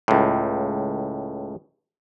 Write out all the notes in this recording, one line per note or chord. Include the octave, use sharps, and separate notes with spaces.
C#2 A2